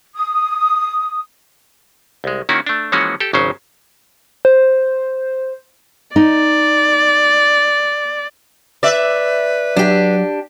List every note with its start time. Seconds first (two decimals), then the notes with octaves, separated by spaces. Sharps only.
0.14 D#6
2.24 C2 G#3
2.49 D#3 A#3 C#4 E4 F#4
2.67 A3 D4
2.92 E3 F3 G#3 A#3 C#4 F#4
3.20 G4 A4
3.33 G#1 C#3 F#3 C#4 C5
4.45 C5
6.16 D#4 D5
8.83 B4 D5 E5
9.76 F#3 D4 G4